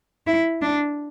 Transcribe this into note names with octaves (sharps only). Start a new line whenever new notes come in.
E4
D4